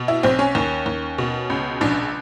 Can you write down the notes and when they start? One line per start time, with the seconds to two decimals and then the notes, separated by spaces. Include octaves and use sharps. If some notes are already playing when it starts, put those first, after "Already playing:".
Already playing: B2
0.08 E4
0.23 B1 C4
0.39 C#4
0.55 D#2
0.86 D#2
1.18 B2
1.50 C#2
1.81 A#1 D4